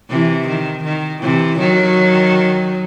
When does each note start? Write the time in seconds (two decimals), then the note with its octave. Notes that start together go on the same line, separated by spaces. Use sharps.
0.09 C3 E3
0.47 D#3
0.84 D#3
1.22 C3 E3
1.59 D#3 F#3